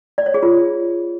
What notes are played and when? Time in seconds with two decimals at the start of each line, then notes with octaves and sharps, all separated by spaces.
0.18 D5
0.26 C#5
0.34 G#4
0.43 F4